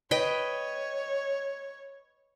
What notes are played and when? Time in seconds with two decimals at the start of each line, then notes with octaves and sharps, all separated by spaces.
0.11 B4 C#5 D#5 G5